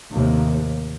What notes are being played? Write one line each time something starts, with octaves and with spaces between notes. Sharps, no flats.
D#2 A2 C3 A#3